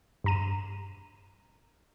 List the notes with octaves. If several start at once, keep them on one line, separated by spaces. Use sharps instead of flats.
G2 A#5 D#7